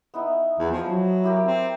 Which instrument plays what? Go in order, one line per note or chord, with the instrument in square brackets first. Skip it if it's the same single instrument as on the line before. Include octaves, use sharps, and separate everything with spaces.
[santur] B3 D#4 E4
[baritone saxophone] E2
F3
F#3
[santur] E4 G4 A#4
[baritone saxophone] C4